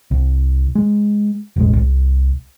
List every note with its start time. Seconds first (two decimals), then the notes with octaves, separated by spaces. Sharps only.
0.11 C2
0.75 G#3
1.56 E1 A1 G#3
1.75 C2